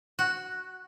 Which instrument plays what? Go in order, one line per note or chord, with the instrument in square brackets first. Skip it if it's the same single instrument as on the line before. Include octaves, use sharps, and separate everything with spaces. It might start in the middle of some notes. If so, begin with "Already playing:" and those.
[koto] F#4